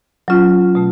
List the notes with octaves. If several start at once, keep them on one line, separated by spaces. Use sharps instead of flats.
F#3 C#4 F4
B2 A3